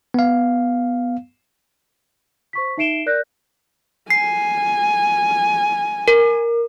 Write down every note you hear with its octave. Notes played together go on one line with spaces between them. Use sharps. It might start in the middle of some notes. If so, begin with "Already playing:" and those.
B3 F5
C5 C#6 B6
D#4 E5 C7 D7 E7 G7
A#4 D5 F#6 G6 A#6
G#5 C7
A#4